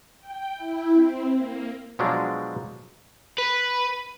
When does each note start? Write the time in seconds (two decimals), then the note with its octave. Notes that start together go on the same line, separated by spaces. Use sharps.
0.19 G5
0.56 E4
0.91 C4
1.36 A#3
1.99 B2 F3 F#3 G#3 D4
3.38 B4